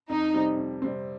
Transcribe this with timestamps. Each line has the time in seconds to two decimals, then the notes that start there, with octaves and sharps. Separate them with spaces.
0.09 F2 D#4
0.34 C3 G3 C4
0.57 F2
0.82 C3 G3 C4